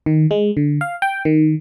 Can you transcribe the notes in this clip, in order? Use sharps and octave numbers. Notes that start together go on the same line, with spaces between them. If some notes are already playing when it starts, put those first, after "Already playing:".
D#3
G#3
D3
F5
G5
D#3